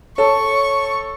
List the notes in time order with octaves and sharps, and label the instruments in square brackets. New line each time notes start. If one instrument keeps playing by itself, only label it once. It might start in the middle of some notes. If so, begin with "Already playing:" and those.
[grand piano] A4 [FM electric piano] C#5 [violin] C#6